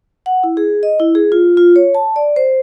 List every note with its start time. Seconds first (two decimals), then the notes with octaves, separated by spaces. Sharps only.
0.26 F#5
0.44 E4
0.57 G#4
0.83 D#5
1.00 E4
1.15 G#4
1.32 F4
1.57 F4
1.76 C#5
1.95 A5
2.16 D5
2.36 C5